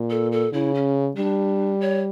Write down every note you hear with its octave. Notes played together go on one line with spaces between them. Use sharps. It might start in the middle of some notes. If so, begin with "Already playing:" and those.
Already playing: A#2
A4
A4
C#3 E4
C#4
G3 D4
C#5